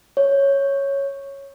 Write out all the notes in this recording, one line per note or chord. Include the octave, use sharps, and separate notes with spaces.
C#5